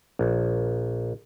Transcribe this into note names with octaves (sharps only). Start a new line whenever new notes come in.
A#1